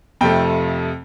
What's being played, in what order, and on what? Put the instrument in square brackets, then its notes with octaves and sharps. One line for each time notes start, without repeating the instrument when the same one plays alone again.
[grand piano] F2 C3 F3 A3 G5